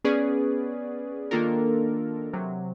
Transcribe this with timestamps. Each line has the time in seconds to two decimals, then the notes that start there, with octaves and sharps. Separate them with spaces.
0.04 B3 C#4 G#4 B4 D5
1.31 D#3 A#3 D4 F4 A4 A#4
2.33 C3 F#3